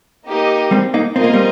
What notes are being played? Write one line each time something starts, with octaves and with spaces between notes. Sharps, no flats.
A#3 D#4 G4 A#4 D#5
G3 C4
A#3 D#4
C4 F4 A#4 D#5
A#3
G3 C4